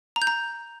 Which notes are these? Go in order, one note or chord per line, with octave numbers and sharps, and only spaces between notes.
A#5
G6
A#5